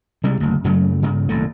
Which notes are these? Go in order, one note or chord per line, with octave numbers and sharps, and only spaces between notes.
C3 G3 G#3
F#1 D2
F#2 C#3 F#3 A3
G2 C#3
D#1 C2 F#2 A3